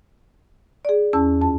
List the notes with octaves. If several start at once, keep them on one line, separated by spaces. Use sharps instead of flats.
G#4 D5
E2 C#4 A5 E6
F2 A5